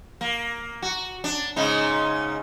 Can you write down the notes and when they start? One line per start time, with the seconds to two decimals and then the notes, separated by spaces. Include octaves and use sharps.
0.21 A#3
0.82 F#4
1.24 D4
1.56 G#2 C#3 D#4